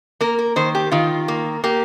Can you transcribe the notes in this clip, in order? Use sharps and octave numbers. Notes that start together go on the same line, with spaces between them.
A#3 A#4
A#4
D#3 C5
G4
D#3 F4
A#3
A#3 G4